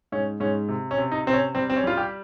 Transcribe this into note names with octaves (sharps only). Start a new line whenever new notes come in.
G#2 C#4
G#2 C#4
C3
C#4
C3
D#4
C3 C4
C#4
G3 C4
C4
C#4
G3 F4
G4